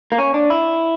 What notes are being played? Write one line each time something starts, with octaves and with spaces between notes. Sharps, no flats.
A#3
C#4
D4
E4